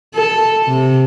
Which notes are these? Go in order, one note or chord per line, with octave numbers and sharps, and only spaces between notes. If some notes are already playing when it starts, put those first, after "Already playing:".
A4
C3